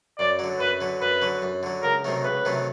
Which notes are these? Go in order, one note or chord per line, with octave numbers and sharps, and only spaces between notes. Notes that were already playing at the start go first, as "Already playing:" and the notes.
F#2 D5
D3 F#3
F#2 B4
D3 F#3
F#2 B4
D3 F#3
F#2
D3 F#3
C#2 A#4
C3 D#3 F#3 A3
C#2 B4
C3 D#3 F#3 A3